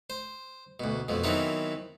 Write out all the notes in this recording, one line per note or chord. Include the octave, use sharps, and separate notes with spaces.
C5
D2 B2
F2 B2 F3
D#3 E3 F#3 B3 C4 A#4